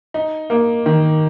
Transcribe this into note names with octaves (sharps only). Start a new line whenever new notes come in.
D#4
A#3
D#3